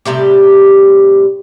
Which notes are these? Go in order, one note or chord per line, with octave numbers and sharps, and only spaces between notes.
A2 C3 G3 G4